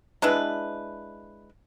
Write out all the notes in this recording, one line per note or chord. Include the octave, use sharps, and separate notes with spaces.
G#3 D4 E4 B4